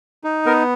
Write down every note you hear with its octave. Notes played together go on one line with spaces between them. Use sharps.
D#4
B3 A#4